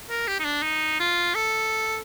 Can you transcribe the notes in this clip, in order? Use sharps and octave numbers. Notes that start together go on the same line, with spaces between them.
A#4
G4
D#4
D4
D#4
F4
A4